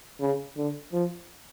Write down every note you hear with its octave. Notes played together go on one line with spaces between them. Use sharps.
C#3
D3
F3